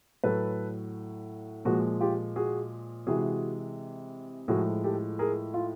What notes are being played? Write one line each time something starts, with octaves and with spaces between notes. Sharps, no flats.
A2 F#3 A4 B4
A#2 F3 G#3 F#4
F4 G4
F#4 G#4
C3 E3 G#3 F#4 G#4
A2 F3 G#3 F#4 G#4
G4 A4
G#4 A#4
F4